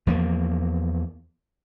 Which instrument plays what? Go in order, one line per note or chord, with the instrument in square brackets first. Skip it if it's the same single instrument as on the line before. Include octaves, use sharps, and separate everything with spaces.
[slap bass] E2 F3 G#3 A#3